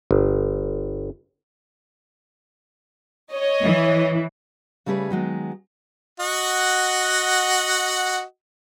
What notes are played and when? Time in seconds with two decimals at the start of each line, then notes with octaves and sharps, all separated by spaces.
0.11 G1
3.32 C#5 D#5
3.63 E3
4.86 C#3 G3 A3 G#4 B4
5.10 D#3 F#3 G#3 B3
6.20 F#4 D#5 F#5